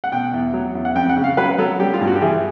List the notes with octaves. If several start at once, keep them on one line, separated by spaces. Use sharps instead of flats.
F#5
B2 G5
E2
F#3
E2
F#5
F2 G5
F#5
C#3
F5
F#3 B4
F#3 A4
G3 G4
F4
G2
F#4
G4
E3 G#4